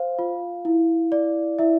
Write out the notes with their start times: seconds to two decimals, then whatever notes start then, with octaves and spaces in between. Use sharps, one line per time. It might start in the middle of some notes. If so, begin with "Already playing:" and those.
Already playing: C5 F5
0.19 F4
0.65 E4
1.12 D5
1.59 E4 E5